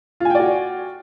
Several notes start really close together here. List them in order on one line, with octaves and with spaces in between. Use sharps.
F4 G#5 G5 D5 F#4